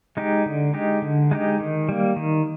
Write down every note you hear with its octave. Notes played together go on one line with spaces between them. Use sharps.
G#3 D#4 G4
D3
G#3 D#4 G4
D3
G#3 D#4 G4
D#3
G3 A#3
D#3